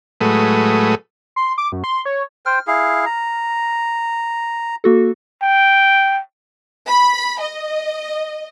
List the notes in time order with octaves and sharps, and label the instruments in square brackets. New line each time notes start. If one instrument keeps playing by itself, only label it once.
[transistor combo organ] A2 F#3 G#3 A3 B4 D#6
[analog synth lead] C6
D6
F#2
C6
C#5
[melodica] C5 G5 [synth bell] F6
[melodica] E4 G#4 F5
A#5
[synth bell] A#3 F#4 A4
[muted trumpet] G5
[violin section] B5
D#5